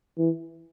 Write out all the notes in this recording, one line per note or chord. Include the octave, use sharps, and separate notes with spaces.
E3